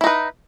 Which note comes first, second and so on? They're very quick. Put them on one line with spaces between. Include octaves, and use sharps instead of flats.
E4 D#4 B4